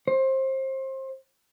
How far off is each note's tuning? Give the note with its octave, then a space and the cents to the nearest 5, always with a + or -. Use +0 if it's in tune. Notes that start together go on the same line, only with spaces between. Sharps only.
C5 +25